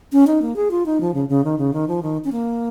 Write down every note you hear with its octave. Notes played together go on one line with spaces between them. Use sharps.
C#4
D#4
A#3
G#4
F4
D#4
F3
C#3
C#3
D#3
C#3
D#3
F3
D#3
C#4
A#3